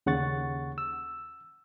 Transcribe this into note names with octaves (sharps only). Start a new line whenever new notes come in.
D#2 C#3 F#5 C#6 A6
E6